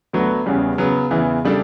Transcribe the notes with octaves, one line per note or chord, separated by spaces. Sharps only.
D2 D3 F#3 B3 F#4
E2 C#3 G3 C#4
C#3 F#3 B3
E2 C#3 E3 B3
C#3 G3 D4 A4